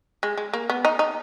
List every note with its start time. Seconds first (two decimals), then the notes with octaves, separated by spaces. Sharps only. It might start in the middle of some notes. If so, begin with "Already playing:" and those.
0.23 G#3
0.38 G#3
0.53 A#3
0.70 B3
0.85 D#4
0.99 D#4